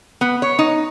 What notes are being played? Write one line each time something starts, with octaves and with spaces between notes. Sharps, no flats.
B3
C#5
D#4